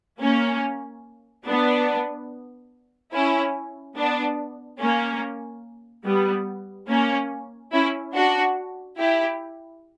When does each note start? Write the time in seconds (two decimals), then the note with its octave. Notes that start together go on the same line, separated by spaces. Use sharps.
0.20 A#3 C#4
1.46 B3 D4
3.13 C#4 E4
3.97 B3 D4
4.80 A#3 C#4
6.05 G3 B3
6.89 A#3 C#4
7.73 C#4 E4
8.14 D4 F#4
8.98 E4 G4